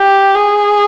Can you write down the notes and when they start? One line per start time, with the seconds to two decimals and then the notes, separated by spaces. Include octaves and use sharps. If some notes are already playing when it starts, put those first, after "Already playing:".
Already playing: G4
0.35 G#4